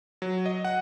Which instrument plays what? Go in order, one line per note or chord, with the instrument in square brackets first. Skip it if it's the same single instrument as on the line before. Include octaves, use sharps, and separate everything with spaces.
[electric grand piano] F#3
D#5
F#5